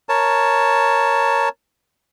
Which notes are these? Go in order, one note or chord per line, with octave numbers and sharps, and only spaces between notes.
A#4 C#5 A5